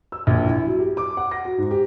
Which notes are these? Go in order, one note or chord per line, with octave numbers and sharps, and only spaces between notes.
E6
A#1
E4
F#3
G4
D6
F#5
A#6
F#4
G#2
G4